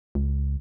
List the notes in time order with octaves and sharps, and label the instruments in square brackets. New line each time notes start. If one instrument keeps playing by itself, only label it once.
[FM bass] C#2